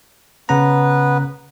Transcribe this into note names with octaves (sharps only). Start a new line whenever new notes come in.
C#3 B3 C#4 B4 A#5